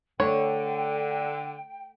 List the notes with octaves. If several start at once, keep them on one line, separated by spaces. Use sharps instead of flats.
D3 A3 C#5 G5